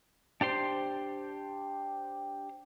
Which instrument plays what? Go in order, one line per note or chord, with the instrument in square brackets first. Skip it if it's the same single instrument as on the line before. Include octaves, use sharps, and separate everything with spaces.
[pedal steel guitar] D4 G4 C5 C6